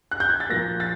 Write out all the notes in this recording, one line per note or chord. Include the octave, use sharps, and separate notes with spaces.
F#6
G6
G#6
A6
A#2 F3 A#3 A#6
A6